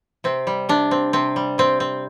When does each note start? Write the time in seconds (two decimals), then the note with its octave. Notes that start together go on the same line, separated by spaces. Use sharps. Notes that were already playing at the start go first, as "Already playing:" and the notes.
0.24 C3 C4
0.47 G3
0.69 C3 D4
0.91 C4
1.13 C3 C4
1.36 G3
1.58 C3 C4
1.80 C4